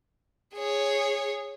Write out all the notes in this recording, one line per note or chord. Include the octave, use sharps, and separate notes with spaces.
G#4 C#5